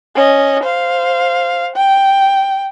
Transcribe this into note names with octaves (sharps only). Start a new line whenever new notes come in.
C#4 D#5
C5 F5
G5